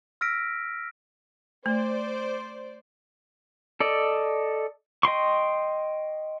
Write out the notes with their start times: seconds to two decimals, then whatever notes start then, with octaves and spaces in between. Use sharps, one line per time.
0.21 E6 F6 A#6 B6 D7
1.66 A3 C5 D5
3.80 A4 D5 D#5
5.03 D#5 G5 C6 C#6